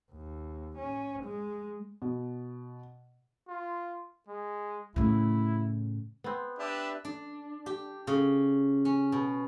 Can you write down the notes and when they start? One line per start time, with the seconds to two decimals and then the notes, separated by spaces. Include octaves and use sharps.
0.12 D#2
0.78 C#4
1.24 G#3
2.02 B2
3.48 F4
4.28 G#3
4.96 A2 C#3 E4
6.24 B3 C4
6.59 D4 G4 B4 E5
7.05 D4
7.66 G4
8.07 C#3
8.85 C#4
9.12 B2